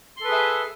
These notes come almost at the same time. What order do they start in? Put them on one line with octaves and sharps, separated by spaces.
C6 A4 B4 G#4 E5